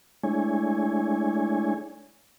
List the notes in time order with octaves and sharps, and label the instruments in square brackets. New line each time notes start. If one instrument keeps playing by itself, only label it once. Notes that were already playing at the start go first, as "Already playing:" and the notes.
[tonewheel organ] G#3 A3 D4 E4 C#5 G#5